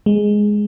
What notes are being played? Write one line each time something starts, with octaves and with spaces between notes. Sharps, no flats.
G#3